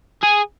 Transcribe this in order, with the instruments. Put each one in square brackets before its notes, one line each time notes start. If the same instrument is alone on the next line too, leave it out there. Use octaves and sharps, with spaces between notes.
[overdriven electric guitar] G#4